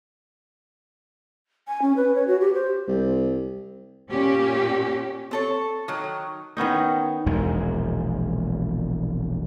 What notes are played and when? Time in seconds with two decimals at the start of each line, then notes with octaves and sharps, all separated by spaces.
1.68 G#5
1.82 C#4
1.96 B4
2.15 C#5
2.27 F#4
2.41 G4
2.55 C5
2.87 C2
4.09 A#2 C#4 G4
5.31 C4 A4 C#5
5.88 D#3 F#3
6.57 D#3 B3 C#4 D#4
7.26 E1 A#1 E2 G#3